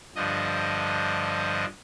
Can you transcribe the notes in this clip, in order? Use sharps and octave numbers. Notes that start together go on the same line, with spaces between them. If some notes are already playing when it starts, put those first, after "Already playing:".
G2 D3 F3 D#5